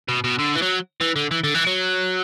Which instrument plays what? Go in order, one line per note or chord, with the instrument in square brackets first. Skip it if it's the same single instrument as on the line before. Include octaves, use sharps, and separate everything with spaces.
[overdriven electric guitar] B2
B2
D3
E3
F#3
E3
D3
E3
D3
E3
F#3